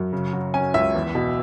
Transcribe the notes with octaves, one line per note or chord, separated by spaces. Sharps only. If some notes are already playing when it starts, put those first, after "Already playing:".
Already playing: F#2
C#3
F#3
C#4 G#5
C#2 E5
E2
B2